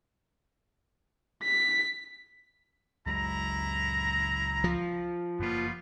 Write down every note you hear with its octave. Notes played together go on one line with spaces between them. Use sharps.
B6
C#2 F#3 G#3 E4 A#5
F3
F#1 C3 G3 A#3 B3 F4